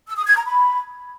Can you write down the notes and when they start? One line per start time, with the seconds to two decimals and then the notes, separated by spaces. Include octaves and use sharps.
0.07 E6
0.17 D#6
0.26 G#6
0.36 A#5
0.45 B5